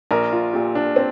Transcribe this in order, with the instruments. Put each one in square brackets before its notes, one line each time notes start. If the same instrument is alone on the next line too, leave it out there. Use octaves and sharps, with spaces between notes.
[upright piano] A#1 [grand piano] A#4
[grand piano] F4
[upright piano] A#2 [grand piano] G4
[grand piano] D4
[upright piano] C4